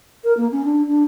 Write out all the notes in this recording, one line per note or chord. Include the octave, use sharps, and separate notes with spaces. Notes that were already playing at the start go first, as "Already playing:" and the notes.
A#4
A#3
C#4
D4
D4